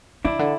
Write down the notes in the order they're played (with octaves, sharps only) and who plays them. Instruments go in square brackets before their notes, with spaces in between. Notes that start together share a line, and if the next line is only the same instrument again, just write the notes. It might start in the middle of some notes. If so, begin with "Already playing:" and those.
[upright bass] C#3 [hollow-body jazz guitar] D4 E4
[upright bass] D3